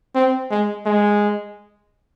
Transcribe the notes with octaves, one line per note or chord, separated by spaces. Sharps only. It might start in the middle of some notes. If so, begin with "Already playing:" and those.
C4
G#3
G#3